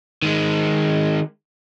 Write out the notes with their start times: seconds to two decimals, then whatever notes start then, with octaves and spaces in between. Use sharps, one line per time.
0.22 D#3 G#3